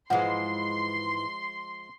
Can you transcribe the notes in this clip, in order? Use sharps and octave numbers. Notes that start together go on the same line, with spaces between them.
G#2 E3 F3 G#3 F#5 C6